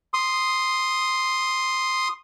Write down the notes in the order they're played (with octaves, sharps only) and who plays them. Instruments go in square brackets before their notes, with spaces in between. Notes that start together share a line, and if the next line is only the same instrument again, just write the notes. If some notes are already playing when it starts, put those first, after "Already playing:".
[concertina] C6 D#6